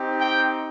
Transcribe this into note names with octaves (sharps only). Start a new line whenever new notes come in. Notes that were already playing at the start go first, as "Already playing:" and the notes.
Already playing: C4 D#4 G4
G5